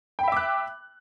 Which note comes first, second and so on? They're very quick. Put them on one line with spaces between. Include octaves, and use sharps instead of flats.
G5 B5 E5 D6 F#6